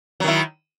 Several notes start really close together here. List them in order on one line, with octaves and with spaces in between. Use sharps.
F#3 D#3 E4